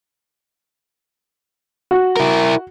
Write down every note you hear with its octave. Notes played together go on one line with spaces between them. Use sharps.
F#4
E4 A#4